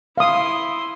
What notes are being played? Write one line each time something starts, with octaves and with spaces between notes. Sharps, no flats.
E4 F5 C6 D#6